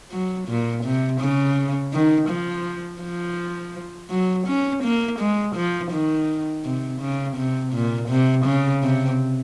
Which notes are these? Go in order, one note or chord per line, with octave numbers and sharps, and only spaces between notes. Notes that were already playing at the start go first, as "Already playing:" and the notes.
F#3
A#2
C3
C#3
D#3
F3
F3
F#3
C#4
A#3
G#3
F3
D#3
C3
C#3
C3
A#2
C3
C#3
C3